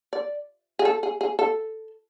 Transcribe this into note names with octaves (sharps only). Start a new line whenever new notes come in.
D5
G#4
A4
G#4
G#4
A4